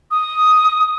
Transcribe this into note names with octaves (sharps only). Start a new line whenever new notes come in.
D#6